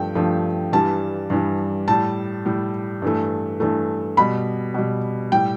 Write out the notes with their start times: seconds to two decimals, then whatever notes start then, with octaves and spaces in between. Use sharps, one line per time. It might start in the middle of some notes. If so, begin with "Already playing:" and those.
Already playing: G2 F3 A3 G5
0.15 G2 F3 A3
0.72 G2 E3 G3 A5
1.30 G2 E3 G3
1.88 A2 G3 A5
2.46 A2 G3
3.02 G2 E3 A3
3.60 G2 E3 A3
4.17 B2 G3 B5
4.74 B2 G3
5.32 A2 G3 G5